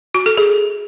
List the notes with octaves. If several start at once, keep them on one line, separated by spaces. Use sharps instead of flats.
F#4
A4
G#4